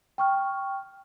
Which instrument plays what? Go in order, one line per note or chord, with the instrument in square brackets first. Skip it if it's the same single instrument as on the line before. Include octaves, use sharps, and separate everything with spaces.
[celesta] G5 C#6 F6